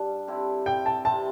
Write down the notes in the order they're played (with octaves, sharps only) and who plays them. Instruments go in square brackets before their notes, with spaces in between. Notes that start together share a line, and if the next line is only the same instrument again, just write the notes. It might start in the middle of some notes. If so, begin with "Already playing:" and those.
Already playing: [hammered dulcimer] G2 G3 D4 G4
D3 C4 E4 G4
[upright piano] G5
A5
[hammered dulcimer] C3 E3 C4 [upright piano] A5